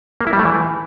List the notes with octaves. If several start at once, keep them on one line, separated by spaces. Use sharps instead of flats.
A#3
E4
G3
A3
E3